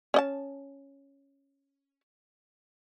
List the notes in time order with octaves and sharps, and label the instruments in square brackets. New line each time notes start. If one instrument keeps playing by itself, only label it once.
[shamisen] C#4 D#5 A5